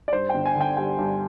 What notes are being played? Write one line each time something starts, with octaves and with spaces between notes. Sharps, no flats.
D5
G2 C5
G1 G5
G#5
D3
G5
G3 G5
G2